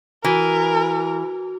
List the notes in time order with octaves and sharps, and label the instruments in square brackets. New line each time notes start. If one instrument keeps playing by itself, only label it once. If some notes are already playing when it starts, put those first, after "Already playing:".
[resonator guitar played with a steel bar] E3 [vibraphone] F#4 [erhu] A#4